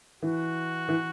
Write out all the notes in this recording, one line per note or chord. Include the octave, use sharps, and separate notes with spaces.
E3 F#4
E3